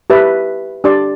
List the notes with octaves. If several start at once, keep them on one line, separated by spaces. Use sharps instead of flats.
G4 B4 E5 A5
D4 G4 D5 A5 C6